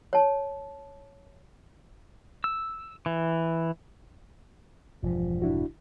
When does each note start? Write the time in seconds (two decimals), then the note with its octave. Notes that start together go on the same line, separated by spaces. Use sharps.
0.13 C#5 A5
2.44 E6
3.06 E3
5.03 E1 G2 F3
5.42 D4 E4 F#4